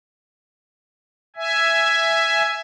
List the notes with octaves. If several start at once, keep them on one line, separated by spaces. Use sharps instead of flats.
E5 G#5